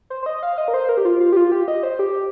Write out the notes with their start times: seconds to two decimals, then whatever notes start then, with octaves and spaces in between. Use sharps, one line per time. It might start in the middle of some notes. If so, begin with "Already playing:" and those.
0.10 C5
0.23 C5
0.26 D#5
0.43 F5
0.58 D#5
0.68 A#4
0.74 C5
0.89 A#4
0.97 G4
1.05 F4
1.20 F4
1.32 G4
1.37 F4
1.52 G4
1.68 D#5
1.83 C5
1.99 G4